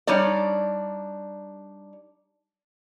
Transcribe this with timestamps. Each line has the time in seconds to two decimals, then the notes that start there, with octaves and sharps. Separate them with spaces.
0.07 G3 D4 D#4 C#5 D5